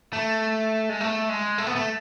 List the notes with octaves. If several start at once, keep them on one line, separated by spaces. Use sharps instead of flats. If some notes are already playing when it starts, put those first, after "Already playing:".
A3
G#3
A3
G#3
A3
B3
A3